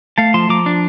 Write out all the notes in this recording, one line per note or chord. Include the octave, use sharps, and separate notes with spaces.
A3 F5 A5
F3 A5 C6
F3 A#5 D6
D4